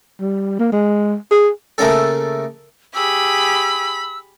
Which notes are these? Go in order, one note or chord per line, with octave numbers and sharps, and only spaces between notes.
G3
A#3
G#3
G#4
C#3 A3 A#3 C#4 A4
G4 G#4 B5 E6